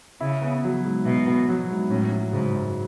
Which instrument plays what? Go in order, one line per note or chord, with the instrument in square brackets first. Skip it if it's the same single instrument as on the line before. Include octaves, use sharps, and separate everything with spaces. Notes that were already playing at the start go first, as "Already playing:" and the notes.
[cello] C#3 [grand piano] E4
[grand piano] B3
F#3
G#2
[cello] B2 [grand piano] E4
[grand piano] B3
F#3
G#2
[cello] A2 [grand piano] C#4
[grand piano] F#3
[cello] G#2 [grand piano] C#3
[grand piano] F#2